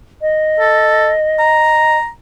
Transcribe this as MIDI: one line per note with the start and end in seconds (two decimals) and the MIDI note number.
0.21 1.97 75
0.60 1.12 69
1.39 2.09 82